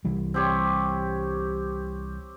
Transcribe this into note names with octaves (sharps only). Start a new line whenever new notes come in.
C2 E3 G3
C4 G4 C#5